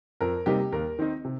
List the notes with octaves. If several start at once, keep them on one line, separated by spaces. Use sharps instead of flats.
F2 A#4
C3 G3 A#3 D#4 G4
D#2 A#4
D#3 C4 D#4
C3